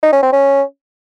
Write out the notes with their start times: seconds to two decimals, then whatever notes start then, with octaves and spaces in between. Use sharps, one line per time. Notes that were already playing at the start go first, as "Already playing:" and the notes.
0.03 D#4
0.13 C#4
0.23 C4
0.32 C#4